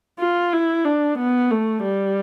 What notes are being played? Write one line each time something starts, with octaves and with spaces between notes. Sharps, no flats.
F4
E4
D4
B3
A3
G3